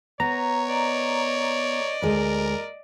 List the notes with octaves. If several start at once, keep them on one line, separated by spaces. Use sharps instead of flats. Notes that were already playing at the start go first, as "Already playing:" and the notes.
B3 C#5 A#5
D5 D#5
D2 G#3 A#4